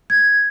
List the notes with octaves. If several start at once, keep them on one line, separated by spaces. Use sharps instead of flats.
G#6